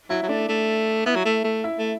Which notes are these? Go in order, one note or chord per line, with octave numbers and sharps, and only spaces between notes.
F#3 E4 E5
F#3
A3 D4 D5
A3
B3 E4 E5
F#3
A3
A3
E4 E5
A3